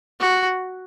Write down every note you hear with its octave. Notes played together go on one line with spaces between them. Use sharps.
F#4